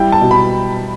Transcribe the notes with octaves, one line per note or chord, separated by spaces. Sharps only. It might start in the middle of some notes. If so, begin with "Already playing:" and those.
Already playing: G3 E4 G5
A5
B2
B5